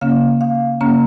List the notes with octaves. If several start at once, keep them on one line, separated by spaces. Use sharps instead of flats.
C#3 A#3 C#4 F5
F5
C#3 A#3 C#4 A#5